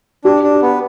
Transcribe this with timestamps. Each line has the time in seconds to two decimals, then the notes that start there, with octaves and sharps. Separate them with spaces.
0.24 D4 G4
0.43 D4
0.62 B3